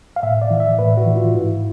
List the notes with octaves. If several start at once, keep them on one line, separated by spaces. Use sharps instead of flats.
F5
A2 E5
D5
E3
E5
A2 B4
F#4
E3
F4
G#2 E4